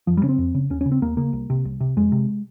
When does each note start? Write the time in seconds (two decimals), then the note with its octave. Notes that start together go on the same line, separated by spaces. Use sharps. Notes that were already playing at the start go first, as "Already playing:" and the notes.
0.07 F2 F3
0.17 G3
0.23 C#3 C#4
0.29 C4
0.38 F2
0.54 C#3
0.70 D#2 C#4
0.81 C#4
0.86 C#3
0.92 C4
1.02 D#2 A#3
1.17 C#3 A#3
1.33 C2
1.50 C3
1.65 C2
1.80 C3
1.96 F2 G#3
2.12 C3